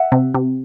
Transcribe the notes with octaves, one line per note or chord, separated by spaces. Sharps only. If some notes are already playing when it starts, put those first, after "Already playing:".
Already playing: E5 F#5
C3
C3